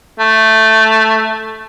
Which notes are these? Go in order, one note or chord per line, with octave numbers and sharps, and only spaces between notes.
A3